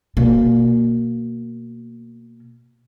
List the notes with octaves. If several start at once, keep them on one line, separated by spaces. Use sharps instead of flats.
B2 A#3